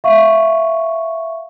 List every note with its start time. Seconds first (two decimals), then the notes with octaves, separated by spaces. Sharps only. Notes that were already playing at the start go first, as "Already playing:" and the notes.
0.04 E5 F5 C#6